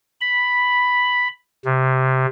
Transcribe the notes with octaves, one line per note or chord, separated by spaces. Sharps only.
B5
C3